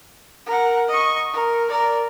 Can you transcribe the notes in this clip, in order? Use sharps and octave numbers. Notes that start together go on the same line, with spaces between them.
A#4 F#5
D#5 C#6
A#4
A#4 D5